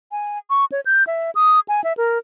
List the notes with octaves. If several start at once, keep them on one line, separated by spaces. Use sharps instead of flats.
G#5
C#6
C#5
G6
E5
D#6
G#5
E5
A#4